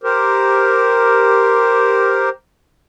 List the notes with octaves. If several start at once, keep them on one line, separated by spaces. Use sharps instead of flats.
G4 A#4 C5